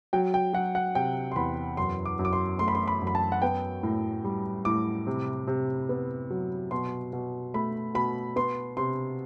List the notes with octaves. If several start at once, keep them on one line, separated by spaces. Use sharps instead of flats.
F#3 G5
G5
F#3 F#5
F#5
C3 G5
C6
E2 B5
F#2 C6
D6
F#2
D6
C6
A3 C6
B5
C6
B5
F#2
B5
A5
F#5
B3 G5
A2
G3
A2 D6
C3
C3
B3
F#3
B2 C6
B2
A3 B5
B2 B5
B3 C6
C3 C6